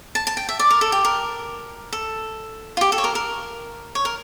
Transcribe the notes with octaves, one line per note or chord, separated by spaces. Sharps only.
A5
A5
G5
E5
D5
A#4
A4
G4
A#4
A4
F4
G4
A4
C#5
A#4
A#4
C#5
A#4